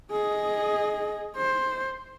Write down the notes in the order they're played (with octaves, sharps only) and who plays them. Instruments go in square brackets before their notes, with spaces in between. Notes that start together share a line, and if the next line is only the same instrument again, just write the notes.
[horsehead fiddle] G#4 D#5
C5